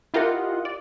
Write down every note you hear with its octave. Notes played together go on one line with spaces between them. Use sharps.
E4 F4 G4 A#4 D#5 F#5
D5